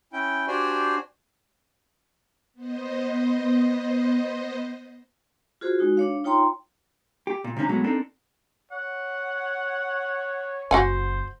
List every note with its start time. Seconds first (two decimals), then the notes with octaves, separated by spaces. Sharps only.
0.13 C#4 E4 G5
0.48 D4 F#4 G4 C5 D5 G#5
2.54 B3 C5 D#5
5.61 F4 F#4 G#4 C5
5.79 G#3 D#4 F#4
5.97 D4 C#5 F5
6.24 D#4 F4 C#5 G5 A#5 C6
7.27 G4
7.44 A#2
7.57 C3 D#3 C#4 D4 A#5
7.69 B2 E3 F#3 G#3 A3
7.84 C4 D4 D#4 A4 A#4
8.72 C#5 F#5
10.71 F#1 F#4 C5 F#5 G#5